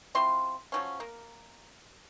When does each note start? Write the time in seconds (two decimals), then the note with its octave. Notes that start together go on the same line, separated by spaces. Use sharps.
0.15 C4 E4 F4 C6
0.72 F3 F#3 C#4
1.00 A#3